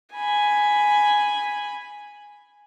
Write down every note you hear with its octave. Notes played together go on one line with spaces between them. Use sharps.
G#5 B5